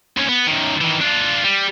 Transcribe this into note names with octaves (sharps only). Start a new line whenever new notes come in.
D#2 C#4
B3
F#2 D#3
D#3 E3
D4 F4
G3